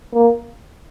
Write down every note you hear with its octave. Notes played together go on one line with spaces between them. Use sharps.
A#3